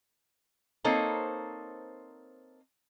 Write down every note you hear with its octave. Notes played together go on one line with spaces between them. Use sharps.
A#3 C4 D#4 A4 C5 C#5